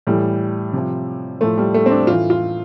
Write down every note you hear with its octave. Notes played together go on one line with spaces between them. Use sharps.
A2 E3 G3
C3 F3
A2 F3 A3
G3
A3
C4
D4
A2 E3 F4
F4